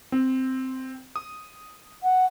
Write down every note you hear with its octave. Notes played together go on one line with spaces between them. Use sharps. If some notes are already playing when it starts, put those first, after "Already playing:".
C4
D#6
F#5